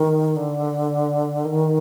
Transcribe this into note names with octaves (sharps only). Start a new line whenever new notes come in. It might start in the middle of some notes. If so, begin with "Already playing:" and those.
Already playing: D#3
D3
D#3